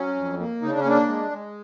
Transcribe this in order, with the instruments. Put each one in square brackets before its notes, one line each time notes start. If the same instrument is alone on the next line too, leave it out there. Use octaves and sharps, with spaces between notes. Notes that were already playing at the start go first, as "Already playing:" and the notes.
Already playing: [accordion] F#3 C#4
F2
A#3
C#3 D#4
D4
C#4
A#3 D4
G#3
G#3